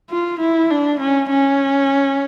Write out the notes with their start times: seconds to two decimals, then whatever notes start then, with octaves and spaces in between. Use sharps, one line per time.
0.10 F4
0.40 E4
0.70 D4
1.00 C#4
1.30 C#4